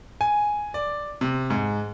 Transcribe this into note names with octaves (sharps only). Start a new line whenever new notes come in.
G#5
D5
C3
G#2